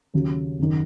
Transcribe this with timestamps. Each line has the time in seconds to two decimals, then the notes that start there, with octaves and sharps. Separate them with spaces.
0.14 D#2 C#3 F#3
0.59 F#1 D#3